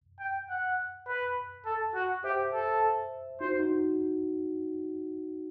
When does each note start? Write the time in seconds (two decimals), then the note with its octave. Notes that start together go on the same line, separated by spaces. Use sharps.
0.20 G5
0.50 F#5
1.07 B4
1.66 A4
1.95 F#4
2.24 G4 C5 E5
2.53 A4
3.40 D#4 F#4 C5
3.59 D#4 F#4